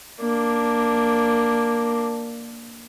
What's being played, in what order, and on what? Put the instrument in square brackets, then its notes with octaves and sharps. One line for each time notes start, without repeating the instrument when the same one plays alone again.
[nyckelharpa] A#3 D4